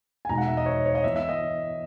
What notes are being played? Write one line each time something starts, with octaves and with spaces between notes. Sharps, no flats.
G#5
E2 B2 G#3 D#4 A#5
F#5
E5
D#5
C#5
C#5
D#5
E3 B3 E4 E5
E5
D#5